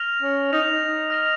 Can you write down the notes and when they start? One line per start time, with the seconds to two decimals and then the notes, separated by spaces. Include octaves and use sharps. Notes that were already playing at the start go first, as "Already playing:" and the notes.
Already playing: F6 A#6 F7
0.22 C#4
0.52 D#4 F6 A#6 F7
0.68 D#4
1.10 F6 A#6 F7